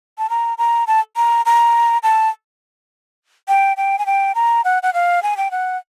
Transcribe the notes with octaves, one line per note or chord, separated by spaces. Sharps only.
A5
A#5
A#5
A5
A#5
A#5
A5
G5
G5
G#5
G5
A#5
F#5
F#5
F5
G#5
G5
F#5